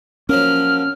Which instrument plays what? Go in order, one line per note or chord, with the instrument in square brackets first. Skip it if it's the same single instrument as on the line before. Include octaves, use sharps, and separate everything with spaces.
[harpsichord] F3 F#3 A#3 [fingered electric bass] C#4 [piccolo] F6